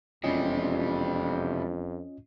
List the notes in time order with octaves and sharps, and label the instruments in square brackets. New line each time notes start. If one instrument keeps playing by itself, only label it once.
[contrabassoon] E1 [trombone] F2 [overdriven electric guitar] C3 G3 [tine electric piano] C#4 F4 D#5